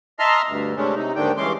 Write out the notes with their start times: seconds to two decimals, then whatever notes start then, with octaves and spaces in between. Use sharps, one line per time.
0.19 D#5 E5 A5 A#5 C6 F6
0.48 D2 G2
0.77 C3 G#3 A3 C#4 D4
0.95 C3 D#4
1.16 D#2 G#2 D3 D#3 D4 G5
1.37 G2 E3 G#3 C#4 C6 D6